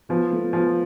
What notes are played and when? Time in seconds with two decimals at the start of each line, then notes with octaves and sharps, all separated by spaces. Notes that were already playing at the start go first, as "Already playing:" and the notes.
0.09 F3 B3
0.32 A3
0.53 F3 B3